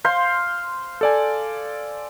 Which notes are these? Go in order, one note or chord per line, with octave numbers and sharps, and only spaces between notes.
C5 F5 C6
A4 D5 G#5